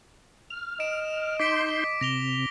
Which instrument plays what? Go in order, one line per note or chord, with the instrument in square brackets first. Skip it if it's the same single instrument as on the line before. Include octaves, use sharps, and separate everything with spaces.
[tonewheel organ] F6
[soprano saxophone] D#5 [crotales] D7 E7
[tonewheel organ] D#4 C6 G6 [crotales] D6 B6 D7
[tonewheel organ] C3 [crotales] A#6 F7 G7